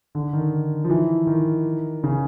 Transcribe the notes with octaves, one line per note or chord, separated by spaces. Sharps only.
D3
D#3
F3
E3
D#3
C#3